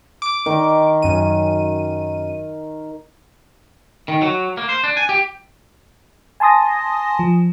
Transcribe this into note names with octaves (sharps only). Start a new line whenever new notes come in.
D6
D#3
F#2 D#7
D#3
F#3
A#3
C5
D4
G#5
G4
G#5 A5 C6 D#6 A#6
F3